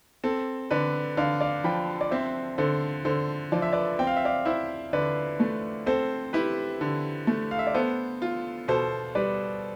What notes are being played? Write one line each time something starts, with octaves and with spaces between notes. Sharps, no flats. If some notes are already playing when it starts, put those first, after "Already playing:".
C4 A4
D3 B4 D5
D3 D5 F5
D5 F5
F3 G5 B5
D5
C4 C5 E5
D3 A4 C5
D3 A4 C5
F3 D5
E5
B4 D5
C4 G5
F5
E5
D5 F5
E4 C5 E5
D3 B4 D5
A3
C4 A4 C5
E4 G4 B4
D3
A3
F5
E5
D5
B3 A4 C5
F4
B2 A4 C5
G3 B4 D5